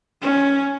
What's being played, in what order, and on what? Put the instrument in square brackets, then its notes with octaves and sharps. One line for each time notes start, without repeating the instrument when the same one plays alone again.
[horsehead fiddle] C#4